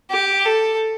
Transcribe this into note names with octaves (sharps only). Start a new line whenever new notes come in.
G4
A4